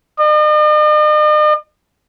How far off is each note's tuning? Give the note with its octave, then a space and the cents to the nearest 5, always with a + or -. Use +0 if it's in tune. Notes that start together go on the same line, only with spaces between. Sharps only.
D#5 -45